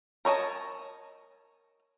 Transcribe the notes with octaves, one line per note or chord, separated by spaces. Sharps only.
A#4 C#5 D#5 A5